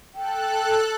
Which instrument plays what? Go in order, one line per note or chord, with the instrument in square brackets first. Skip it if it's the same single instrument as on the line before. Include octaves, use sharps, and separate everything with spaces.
[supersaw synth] A4 F#6 [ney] G5